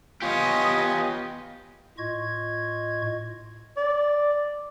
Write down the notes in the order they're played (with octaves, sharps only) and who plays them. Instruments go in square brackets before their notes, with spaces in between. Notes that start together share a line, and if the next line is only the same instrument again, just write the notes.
[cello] B3 D#5 [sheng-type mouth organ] F4 G#5 [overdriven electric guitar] G4 C#5
[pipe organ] A2 F4 D#5 C#6 G#6
[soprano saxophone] D5